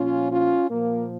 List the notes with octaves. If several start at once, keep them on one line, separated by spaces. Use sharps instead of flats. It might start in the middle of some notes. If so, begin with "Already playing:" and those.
Already playing: A#2 F3 C#4 F4
C#4 F4
A#2 F3 A#3